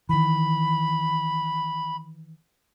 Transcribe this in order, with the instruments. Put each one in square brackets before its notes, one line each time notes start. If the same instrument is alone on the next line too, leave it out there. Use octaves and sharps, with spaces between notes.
[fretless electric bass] D#3 E3 [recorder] B5